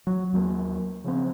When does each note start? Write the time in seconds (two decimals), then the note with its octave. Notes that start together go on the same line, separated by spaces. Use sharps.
0.07 F#3
0.33 D#2 F#3 G3 A#3
1.04 C#3 F3 B3 C4